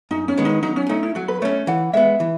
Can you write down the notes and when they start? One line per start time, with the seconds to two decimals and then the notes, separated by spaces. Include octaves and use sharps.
0.11 F#2 D#4
0.28 C#4
0.38 D#3 G#3 B3
0.45 D#4
0.63 F#3 D#4
0.76 C#4
0.89 A3 C#4 D#4
1.03 E4
1.15 F#3 F#4
1.28 B4
1.42 A3 C#4 C#5
1.67 E3 F#5
1.93 G#3 B3 E5
2.20 E3